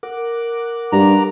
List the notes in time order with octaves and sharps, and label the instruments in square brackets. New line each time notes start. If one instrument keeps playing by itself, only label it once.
[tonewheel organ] A#4 F#5 D6
[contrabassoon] G2 [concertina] A#5